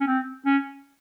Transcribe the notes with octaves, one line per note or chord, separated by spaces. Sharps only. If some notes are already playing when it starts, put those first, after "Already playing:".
C#4
C4
C#4